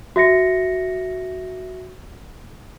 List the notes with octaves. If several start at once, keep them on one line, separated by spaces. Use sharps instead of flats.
F#4 E5 A#6 C#7